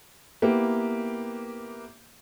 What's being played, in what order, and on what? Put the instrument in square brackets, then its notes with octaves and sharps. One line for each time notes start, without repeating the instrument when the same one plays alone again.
[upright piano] A#3 B3 E4 G4 B4